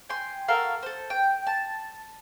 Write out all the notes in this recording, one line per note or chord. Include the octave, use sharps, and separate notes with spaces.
G5 G#5 C6
F#4 A4 A#4 F5
A4 C5
G5
A5